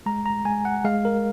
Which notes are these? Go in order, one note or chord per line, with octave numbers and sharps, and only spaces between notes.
G#3 A#5
A#5
G#3 G#5
F#5
G#3 F5
A#4